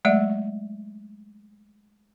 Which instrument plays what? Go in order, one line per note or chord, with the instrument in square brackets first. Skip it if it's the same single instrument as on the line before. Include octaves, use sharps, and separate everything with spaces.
[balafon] F#3 G#3 A3 D5 E5 F#5